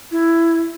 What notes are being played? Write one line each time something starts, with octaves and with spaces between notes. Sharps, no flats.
E4